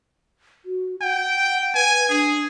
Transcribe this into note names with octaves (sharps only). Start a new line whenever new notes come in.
F#4
F#5 G5
B4 G#5
D4 G#4